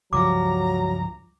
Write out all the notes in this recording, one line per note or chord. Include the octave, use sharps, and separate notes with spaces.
C#2 G2 F3 F#3 A#5 D6